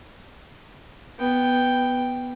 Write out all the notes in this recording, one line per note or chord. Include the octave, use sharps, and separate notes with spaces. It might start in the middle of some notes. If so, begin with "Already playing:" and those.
B3 G5